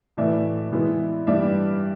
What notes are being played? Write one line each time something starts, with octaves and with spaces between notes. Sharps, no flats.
A2 E3 A3 D5 E5
E3 G#3 B3 E4
G2 E3 G3 D5 E5